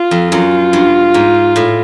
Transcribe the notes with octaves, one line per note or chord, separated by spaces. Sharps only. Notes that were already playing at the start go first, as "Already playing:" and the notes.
Already playing: F4
F2
F#2 F4
G2
G#2
A2